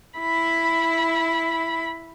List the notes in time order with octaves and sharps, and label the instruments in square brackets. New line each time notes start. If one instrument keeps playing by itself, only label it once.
[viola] E4 B5